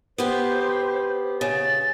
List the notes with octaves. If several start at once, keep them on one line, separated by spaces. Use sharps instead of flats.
B3 G4 C5
C#3 A6